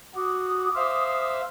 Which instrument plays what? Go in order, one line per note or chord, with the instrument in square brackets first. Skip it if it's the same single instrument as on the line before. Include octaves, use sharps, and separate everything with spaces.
[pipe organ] F#4 [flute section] D6 D#6
[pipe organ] C5 E5 F5